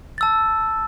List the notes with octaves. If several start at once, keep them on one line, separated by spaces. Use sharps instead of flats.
A5 E6 A6